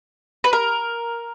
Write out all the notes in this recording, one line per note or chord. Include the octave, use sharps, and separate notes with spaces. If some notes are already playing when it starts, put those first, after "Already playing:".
B4
A#4